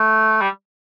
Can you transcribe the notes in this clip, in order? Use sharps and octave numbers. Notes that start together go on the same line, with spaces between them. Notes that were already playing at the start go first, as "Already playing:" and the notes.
Already playing: A3
G3